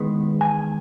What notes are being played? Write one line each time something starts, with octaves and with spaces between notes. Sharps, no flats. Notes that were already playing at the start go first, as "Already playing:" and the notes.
Already playing: E2 D#3 G#3 B3
G#5